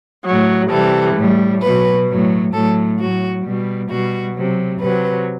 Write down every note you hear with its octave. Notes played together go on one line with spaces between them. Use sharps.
A2 F#3
C3 E3 G3 A4
A2 G3
B2 F#3 B4
A2 F#3
A2 F#3 A4
A2 F#3 F#4
B2 G3
B2 G3 F#4
C3 F#3
C3 F#3 B4